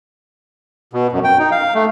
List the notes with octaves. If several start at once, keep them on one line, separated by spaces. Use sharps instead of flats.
B2
F#2
G5
D#4
F5
A3